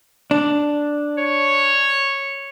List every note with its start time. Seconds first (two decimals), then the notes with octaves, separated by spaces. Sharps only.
0.31 D4
1.18 C#5